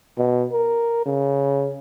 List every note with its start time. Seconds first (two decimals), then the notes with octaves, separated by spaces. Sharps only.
0.17 B2
0.52 A#4
1.06 C#3